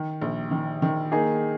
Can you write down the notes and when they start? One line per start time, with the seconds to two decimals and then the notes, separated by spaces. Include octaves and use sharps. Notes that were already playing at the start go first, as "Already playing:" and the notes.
Already playing: D#3
0.22 A#1
0.51 D#3
0.82 D#3
1.12 A#3 D#4 G#4